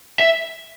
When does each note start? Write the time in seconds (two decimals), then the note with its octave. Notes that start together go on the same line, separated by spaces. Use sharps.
0.20 E5